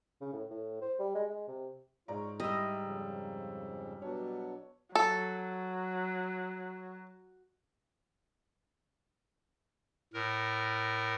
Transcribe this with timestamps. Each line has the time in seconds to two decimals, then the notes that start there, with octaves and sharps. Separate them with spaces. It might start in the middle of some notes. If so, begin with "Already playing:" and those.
0.21 C#3
0.33 A2
0.51 A2
0.82 C5
0.99 G3
1.15 G#3
1.30 G#3
1.48 C3
2.08 G#2 F4 C#5 D5 A#5
2.40 G3 E4 D#5 E6
2.83 F2 C#3
4.02 B2 F#3 D4 C#5
4.95 F#3 A4
10.14 A2 A#4